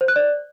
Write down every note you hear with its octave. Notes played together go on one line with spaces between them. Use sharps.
C5
F#6
D5